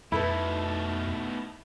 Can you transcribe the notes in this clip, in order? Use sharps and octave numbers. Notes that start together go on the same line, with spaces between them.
F2 B2 A3 D#4 E4 A4 B4